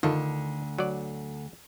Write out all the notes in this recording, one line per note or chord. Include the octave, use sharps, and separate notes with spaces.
D2 D3 D#3 F4 A4
F#3 D5